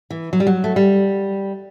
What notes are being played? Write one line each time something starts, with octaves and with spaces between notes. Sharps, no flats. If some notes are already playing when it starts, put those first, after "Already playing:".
E3
F#3
G3
F#3
A3
G3